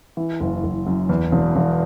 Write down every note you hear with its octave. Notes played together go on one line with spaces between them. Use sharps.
E3
F#1
F#1
F#2
E2
E1
E1